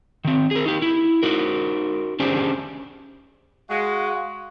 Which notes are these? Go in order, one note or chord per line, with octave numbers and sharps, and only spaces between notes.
D#3 C4
G#4 A#4
D#4 G4
E4
D#4 F#4 A#4
C#4 D4 G4 G#4 C5
G#3 F#4 F5